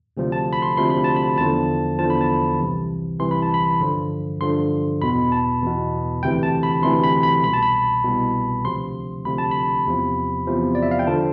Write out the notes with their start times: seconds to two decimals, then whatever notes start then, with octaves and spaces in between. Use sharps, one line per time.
0.17 D2 C3 F3
0.32 A5
0.53 B5
0.62 C6
0.77 D2 C3 F3 C6
0.90 B5
1.04 A5
1.16 B5
1.38 E2 D3 F3 A5
1.99 E2 D3 F3 A5
2.10 B5
2.21 A5
2.59 C2 C3 E3
3.20 C2 C3 E3 C6
3.31 B5
3.42 A5
3.54 B5
3.80 G2 D3 F3
4.41 G2 D3 F3 C6
5.01 E2 B2 B5
5.32 A5
5.62 E2 B2
6.23 D2 C3 E3 G5
6.43 A5
6.63 B5
6.83 D2 C3 E3 C6
7.04 B5
7.23 B5
7.44 C2 B2 B5
7.53 A5
7.63 B5
8.04 C2 B2
8.64 D2 C3 F3 C6
9.25 D2 C3 F3 B5
9.38 A5
9.51 B5
9.86 E2 C3 F3
10.47 E2 C3 F3
10.75 D5
10.83 E5
10.91 F5
10.99 G5
11.07 D3 F3 A5